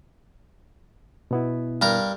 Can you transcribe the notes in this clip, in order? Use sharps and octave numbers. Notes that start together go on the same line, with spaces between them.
B2 B3 E4
G2 A#4